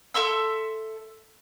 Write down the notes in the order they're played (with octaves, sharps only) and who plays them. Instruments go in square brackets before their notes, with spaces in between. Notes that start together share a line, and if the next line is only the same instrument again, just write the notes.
[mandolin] A4 E5 C6 E6